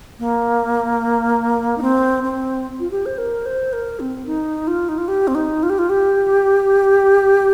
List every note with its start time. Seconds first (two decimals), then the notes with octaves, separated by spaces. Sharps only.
0.19 A#3
1.78 D#4
1.82 C4
2.24 C4
2.80 F4
2.91 G4
3.06 C5
3.18 A#4
3.46 C5
3.73 A#4
4.00 C4
4.26 D#4
4.67 F4
4.89 D#4
4.98 F4
5.08 G4
5.28 C4
5.35 D#4
5.63 F4
5.70 G4
5.78 F4
5.89 G4